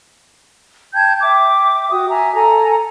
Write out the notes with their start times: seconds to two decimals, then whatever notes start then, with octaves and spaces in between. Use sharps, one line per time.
0.94 G5 A5 G6 G#6
1.22 E5 G5 D6
1.91 F#4 G5 D#6
2.10 E5 G#5 A#5
2.34 A4 G#5 A#5